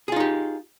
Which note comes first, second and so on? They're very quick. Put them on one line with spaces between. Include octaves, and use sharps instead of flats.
G#4 F4 D#4 G4